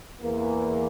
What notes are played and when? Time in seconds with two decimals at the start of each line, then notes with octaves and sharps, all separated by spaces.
0.20 E2 E3 A#3